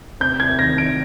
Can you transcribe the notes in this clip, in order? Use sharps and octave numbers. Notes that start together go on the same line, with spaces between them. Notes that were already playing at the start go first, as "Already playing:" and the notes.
C3 G6
C2 G#6
D#3 A#6
D#3 D7